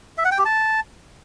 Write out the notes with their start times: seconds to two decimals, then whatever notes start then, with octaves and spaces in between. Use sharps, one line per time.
0.18 E5
0.25 F#5
0.31 G5
0.38 G4
0.45 A5